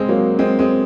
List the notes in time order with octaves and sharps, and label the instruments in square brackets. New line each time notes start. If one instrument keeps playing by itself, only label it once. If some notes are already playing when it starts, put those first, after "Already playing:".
Already playing: [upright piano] G#3 C4
F#3 A#3
G#3 C4
G#3 C4